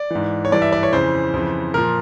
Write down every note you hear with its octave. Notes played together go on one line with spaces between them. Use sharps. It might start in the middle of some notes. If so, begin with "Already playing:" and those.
Already playing: D5
G#2 E3
C#5
G2 E3 D5
E5
D5
C#5
F2 C#3 E3 C5
F2 C#3 E3
A#2 F3 A#4